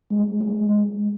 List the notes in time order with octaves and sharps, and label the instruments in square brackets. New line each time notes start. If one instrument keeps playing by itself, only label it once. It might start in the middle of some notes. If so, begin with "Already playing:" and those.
[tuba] G#3
G#3
G#3